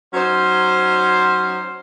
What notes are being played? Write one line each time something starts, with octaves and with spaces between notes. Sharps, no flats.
F#3 C#4 D#4 C5